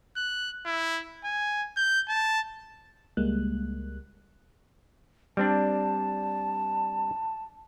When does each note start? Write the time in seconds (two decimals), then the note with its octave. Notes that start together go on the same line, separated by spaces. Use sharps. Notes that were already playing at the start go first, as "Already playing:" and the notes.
0.16 F#6
0.65 E4
1.24 G#5
1.77 G6
2.09 A5
3.17 C#2 G3 G#3 A#3 F#6
5.37 G3 C4 D4 A5